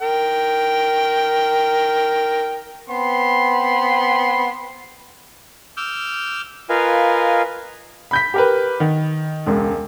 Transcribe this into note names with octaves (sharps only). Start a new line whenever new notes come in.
A#4 G5
B3 C4 B5 C6
D6 E6 F6 G6
F4 A#4 B4 D#5 F5 G#5
B5 G6 B6
G4 A#4 B4
D#3
E1 C#2